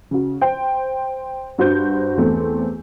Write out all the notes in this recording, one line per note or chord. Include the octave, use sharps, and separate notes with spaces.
C#3 F#4
C5 G5
G2 F#4 C5 G6
E2 A3 C4